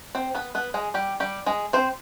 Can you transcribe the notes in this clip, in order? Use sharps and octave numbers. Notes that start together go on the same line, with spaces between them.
C4 C5
B3 B4
B3 B4
G#3 G#4
G3 G4
G3 G4
G#3 G#4
C4 C5